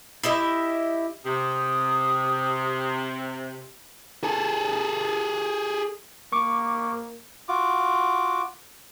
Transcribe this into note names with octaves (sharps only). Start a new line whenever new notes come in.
E4 G4 D#5 E5
C3 D#6
G#4 A4
A#3 C#6 D6
F4 F#4 D6